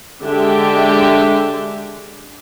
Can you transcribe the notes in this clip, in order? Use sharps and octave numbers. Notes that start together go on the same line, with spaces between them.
D3 G#3 D4 G4 E5